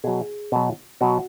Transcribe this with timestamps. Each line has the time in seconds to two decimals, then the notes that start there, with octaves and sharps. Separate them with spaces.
0.04 B2 F#3 G#4
0.52 B2 F#3
1.01 B2 F#3 F#4